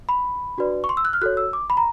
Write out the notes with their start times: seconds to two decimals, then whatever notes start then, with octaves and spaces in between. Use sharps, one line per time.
0.09 B5
0.58 D4 F#4 B4 D5
0.84 C#6
0.89 C6
0.97 E6
1.05 F#6
1.13 F6
1.21 F#4 A4 C#5 F#6
1.37 E6
1.53 D6
1.70 B5
1.77 A#5